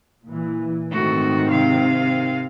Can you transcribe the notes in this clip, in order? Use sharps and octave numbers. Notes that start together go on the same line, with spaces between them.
A#2 E3
G#2 D#3 A3 C4 F#4
C3 F5